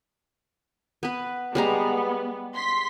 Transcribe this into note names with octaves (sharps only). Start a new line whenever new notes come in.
B3 B4
G3 G#3 B3 A#5
C6 B6